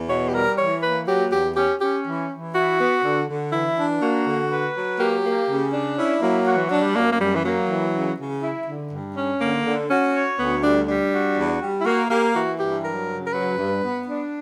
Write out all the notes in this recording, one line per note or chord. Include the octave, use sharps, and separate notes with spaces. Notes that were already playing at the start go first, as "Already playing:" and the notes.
Already playing: E2
B2 C#5
G4
G3 A#4
E3 C#5
A#3 B4
F#3 G4
E2 G4
C#4 G4
C#4 G4
E3
E3
E4 F#4
B3
D3
D3
E3 E4
D4
A#3 F#4
D3
B4
F#3
A#3 G4
A#3
C#3
D4
C#4 E4
F#3 A#3
F#4
E3
F#3 D4
G3
F#2 A#3
A#3
F#2 G3
E3
F#3 A#3
E3
C#3
C#3
E4
D3
G2
C#4
D3 A#3
D3
C#4 F#4
C#5
D2 B3
G3 D4
G3 D4
F#4
E2
G3
E4
A#3 F#4
A#3 G4
E3 F#4
G2 G4
F#3 A#4
C#3
A#4
F#3 B4
G2
B3
D4